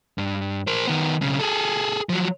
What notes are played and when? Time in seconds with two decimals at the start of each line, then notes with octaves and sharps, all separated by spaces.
0.18 G2
0.67 A#4 C5
0.87 D#3 B3
1.21 B1 C#3
1.39 G#4 A4
2.09 F3 F#3